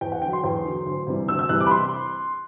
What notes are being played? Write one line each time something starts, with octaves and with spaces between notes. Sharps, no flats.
E2 G5
F#5
D3 F#3 G5
C6
E2
D3 F#3
D2
C3 E3 G3
D2 E6
E6
C3 E3 G3 F#6
D6
B5
C6